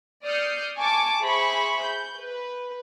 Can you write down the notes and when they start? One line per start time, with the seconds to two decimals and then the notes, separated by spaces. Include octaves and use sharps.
0.24 D5 D#6 F6 G6 C7 C#7
0.78 G#5 A5 C#6 D6
1.23 G#4 C5 E5 B5 C#6
1.83 G6
2.19 B4